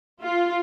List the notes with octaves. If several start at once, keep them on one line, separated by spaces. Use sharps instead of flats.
F4